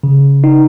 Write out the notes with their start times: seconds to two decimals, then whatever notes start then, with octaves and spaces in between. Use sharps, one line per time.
0.03 C#3
0.44 D#4